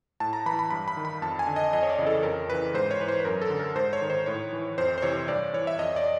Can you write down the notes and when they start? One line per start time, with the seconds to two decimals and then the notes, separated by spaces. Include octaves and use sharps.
0.20 A2 A5
0.33 A#5
0.46 E3 B5
0.59 B5
0.71 G2 B5
0.88 B5
0.97 D#3
1.05 B5
1.22 F2 A5
1.39 G#5
1.47 D3
1.56 D#5
1.73 F2 D#5
1.83 C#5
1.90 D5
1.98 C#3 E3
2.07 A4
2.23 F2 A#4
2.48 C#3 E3 B4
2.74 G#2 C5
2.91 C#5
3.00 E3 B4
3.08 C5
3.20 B4
3.25 F#2 A#4
3.42 A4
3.50 D3
3.59 A#4
3.75 G#2 C5
3.93 C#5
4.02 D#3
4.10 C5
4.26 A2 C#5
4.53 E3
4.78 F2 C5
4.98 C5
5.02 C3 E3 C#5
5.28 G2 D5
5.54 E3 C#5
5.67 E5
5.79 F2 D#5
5.96 D5